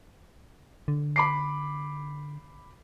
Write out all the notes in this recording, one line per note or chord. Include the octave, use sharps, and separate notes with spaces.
D3
B5 D6 C7